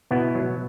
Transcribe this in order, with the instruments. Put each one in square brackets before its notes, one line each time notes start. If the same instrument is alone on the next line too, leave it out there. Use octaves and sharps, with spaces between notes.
[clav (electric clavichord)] B2 B3 E4
F#3